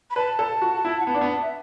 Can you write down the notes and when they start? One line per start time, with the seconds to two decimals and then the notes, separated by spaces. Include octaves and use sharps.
0.10 B5
0.16 B4 A5
0.39 A4
0.62 F#4
0.85 E4
1.00 F#5
1.07 B3 A5
1.14 D4
1.21 B3
1.30 A5
1.42 E5